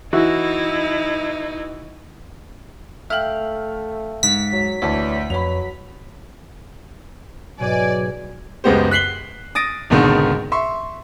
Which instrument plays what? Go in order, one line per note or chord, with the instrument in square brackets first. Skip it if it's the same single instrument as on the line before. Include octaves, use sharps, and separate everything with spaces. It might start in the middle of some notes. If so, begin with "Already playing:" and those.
[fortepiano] E3 F#4 [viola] D#4 E4
[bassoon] A3 [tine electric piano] E5 F5 G5 [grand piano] F6 F#7
[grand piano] G#2 [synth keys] B6
[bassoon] F#3
[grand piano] D2 A5 [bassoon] E3 [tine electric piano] C#5 D5
[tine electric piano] F2 B4 C#5 [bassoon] F#3 [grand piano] B5 F7
[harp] G#2 B2 [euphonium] F#3 [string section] D5 [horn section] G#5
[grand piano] C#2 F#2 G#3 B3 G4 C5
F#6 B6 C7 F#7 G7
D#6 A6 A#6 D7
G#1 C#2 G#2 B2 D3 D#3
E5 C6 C#6